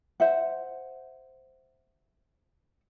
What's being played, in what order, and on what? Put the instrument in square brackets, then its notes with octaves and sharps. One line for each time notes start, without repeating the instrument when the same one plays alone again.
[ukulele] C5 E5 F#5